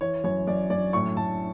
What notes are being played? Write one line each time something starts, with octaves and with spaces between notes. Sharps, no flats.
E3 C#5
F#2 C#5
F#2 D5
F#2 D5
A2 C#6
A2 A5